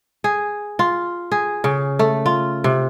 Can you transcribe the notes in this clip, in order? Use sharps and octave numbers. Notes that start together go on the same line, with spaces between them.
G#4
F4
G#4
C#3
A3
F4
C3